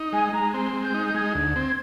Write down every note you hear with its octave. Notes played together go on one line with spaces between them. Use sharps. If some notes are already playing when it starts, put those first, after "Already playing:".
Already playing: D#4
G#3 G#5
G#5
G#3 A#5
C4 C6
G#3
G6
D#4
G6
G#3 G#6
D2
C4